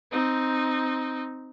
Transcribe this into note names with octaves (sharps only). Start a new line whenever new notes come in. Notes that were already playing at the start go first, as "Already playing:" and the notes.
C4 D#4